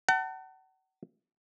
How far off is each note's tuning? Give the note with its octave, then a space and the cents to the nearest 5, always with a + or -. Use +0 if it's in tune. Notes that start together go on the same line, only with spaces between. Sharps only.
F#5 +40 A5 +40